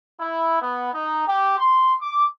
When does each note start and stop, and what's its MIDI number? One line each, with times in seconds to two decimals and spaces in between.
0.20 0.58 64
0.61 0.92 59
0.92 1.26 63
1.27 1.54 67
1.58 1.93 84
2.00 2.24 86